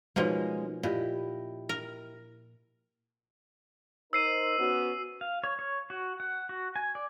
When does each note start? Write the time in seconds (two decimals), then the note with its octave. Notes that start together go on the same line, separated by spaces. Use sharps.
0.16 B2 F3 G#3 A#3 C#4 D#4
0.83 A#2 E4 G4 D#5
1.69 A#4
4.13 D#4 A#4 C5 E6 C7 D#7
4.60 B3 C#4 F#4
5.21 F5
5.44 C#5
5.59 C#5
5.90 F#4
6.20 F#5
6.49 F#4
6.76 G#5
6.95 D5